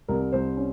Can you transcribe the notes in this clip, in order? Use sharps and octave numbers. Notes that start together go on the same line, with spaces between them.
C2 A#4
C2 C5
C#4